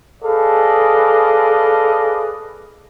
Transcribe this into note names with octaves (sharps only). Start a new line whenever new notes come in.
G#4 A4 B4 D5 D#5 F5